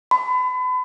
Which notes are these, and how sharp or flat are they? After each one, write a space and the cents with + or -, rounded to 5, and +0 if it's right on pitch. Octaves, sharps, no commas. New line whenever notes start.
B5 +35